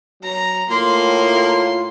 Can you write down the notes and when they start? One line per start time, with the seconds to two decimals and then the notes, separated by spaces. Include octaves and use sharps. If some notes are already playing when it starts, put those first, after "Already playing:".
0.23 F#3 A#5
0.70 A2 A#3 F4 C6